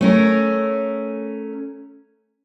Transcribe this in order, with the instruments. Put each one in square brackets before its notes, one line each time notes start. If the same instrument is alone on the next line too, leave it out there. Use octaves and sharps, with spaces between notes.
[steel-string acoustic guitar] A3 C#4 A#4